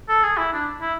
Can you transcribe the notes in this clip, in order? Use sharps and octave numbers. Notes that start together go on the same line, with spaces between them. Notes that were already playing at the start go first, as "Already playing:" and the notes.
A4
G#4
E4
D4
E4